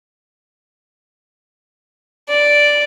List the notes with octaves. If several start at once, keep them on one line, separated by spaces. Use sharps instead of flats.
D5